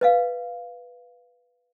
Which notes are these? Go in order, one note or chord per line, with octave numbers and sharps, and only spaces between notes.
B4 D#5 F5